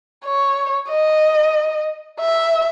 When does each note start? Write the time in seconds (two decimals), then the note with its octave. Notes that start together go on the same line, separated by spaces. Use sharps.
0.25 C#5
0.90 D#5
2.20 E5